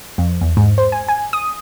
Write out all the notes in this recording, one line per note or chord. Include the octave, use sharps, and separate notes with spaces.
F2
E2
G#2
C5
G#5
G#5
D#6